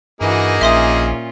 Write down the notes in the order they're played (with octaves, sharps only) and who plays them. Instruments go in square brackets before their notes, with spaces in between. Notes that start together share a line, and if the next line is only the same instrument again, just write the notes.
[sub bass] G2 [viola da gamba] E3 F#4 [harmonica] A#3 D#4 G#4
[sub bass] A#1 [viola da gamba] A#2 C#4 F4 [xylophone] E5 C6 D#6